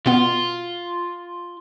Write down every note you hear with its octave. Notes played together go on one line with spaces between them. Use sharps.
B2 B3 F4